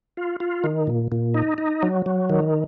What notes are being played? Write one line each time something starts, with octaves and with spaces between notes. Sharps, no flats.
F4
F4
D#3
A#2
A#2
D#4
D#4
F#3
F#3
D#3